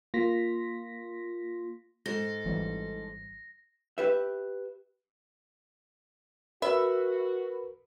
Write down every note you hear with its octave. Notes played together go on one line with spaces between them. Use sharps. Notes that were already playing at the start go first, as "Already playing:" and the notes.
A#3 F4 C6 A#6 B6
G#2 A4 A#6
G#1 E3 G3
G4 B4 E5
F#4 A#4 B4 E5 B5